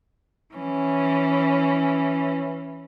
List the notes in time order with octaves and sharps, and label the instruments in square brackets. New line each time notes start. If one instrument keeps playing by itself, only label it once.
[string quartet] E3 C#4